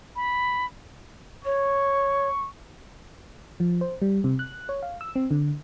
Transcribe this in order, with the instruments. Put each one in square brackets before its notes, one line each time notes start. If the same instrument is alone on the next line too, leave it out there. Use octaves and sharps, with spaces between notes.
[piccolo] B5
[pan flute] C#5 [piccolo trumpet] C#6
[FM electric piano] F3
C5
G3
C3
F#6
C#5
F5
E6
C4
D3